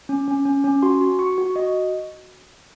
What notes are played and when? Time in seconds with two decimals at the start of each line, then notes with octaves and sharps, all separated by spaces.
0.09 C#4
0.28 C#4
0.46 C#4
0.64 C#4
0.82 F#4 C6
1.01 F#4
1.19 F#4 C#6
1.38 F#4
1.56 F#4 D#5